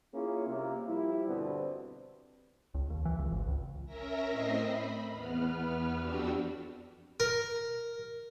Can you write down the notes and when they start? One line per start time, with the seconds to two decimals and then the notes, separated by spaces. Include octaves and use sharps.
0.14 A#3 C#4 E4 F4 G#4
0.47 C2 C3 A#3
0.88 F3 G3 E4
1.26 G2 B2 D3 B3 C4
2.74 C#2
2.90 D#2
3.05 E3
3.19 C#2
3.31 G#1
3.47 C#2
3.86 C#4 A#4 E5 A#6
4.30 A2 C4 D#5 E5 A#6 C7
4.65 B5
5.12 E2 B3 B4 F6
5.99 F2 D4 F#4 G4 E6
7.20 A#4